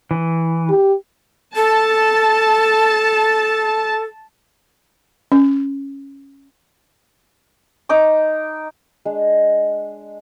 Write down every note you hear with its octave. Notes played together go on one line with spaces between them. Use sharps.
E3
G4
A4 A5
C#4
D#4 D6
G#3 D4